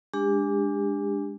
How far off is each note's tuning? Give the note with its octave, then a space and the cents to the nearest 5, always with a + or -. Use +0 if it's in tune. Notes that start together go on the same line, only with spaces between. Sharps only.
G#3 -10 D4 -5 G4 +30